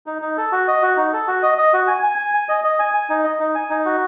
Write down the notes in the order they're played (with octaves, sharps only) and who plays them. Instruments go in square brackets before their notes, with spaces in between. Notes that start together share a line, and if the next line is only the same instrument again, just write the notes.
[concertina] D#4
D#4
A4
F#4
D#5
F#4
D#4
A4
F#4
D#5
D#5
F#4
G#5
G#5
G#5
G#5
D#5
D#5
G#5
G#5
D#4
D#5
D#4
G#5
D#4
F#4